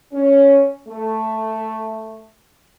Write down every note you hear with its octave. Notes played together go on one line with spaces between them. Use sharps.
C#4
A3